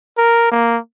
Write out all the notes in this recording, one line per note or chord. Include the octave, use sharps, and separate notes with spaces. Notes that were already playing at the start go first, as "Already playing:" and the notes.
A#4
A#3